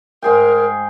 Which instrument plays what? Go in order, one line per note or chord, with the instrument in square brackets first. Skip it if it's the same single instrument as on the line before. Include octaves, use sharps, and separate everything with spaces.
[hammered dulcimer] G#2 G#4 G5 [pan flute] A#4